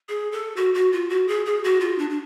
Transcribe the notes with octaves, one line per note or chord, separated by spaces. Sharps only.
G#4
A4
F#4
F#4
F4
F#4
G#4
G#4
F#4
F4
D4
D4